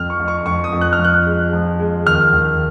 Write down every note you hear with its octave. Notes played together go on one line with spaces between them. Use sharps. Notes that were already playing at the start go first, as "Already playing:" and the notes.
Already playing: F2 F6
C#6
F2
C#6
F2 C#6
D#6
F2
F#6
F6
F3
F#6
G#3
F3
G#3
D#2 F6
D#2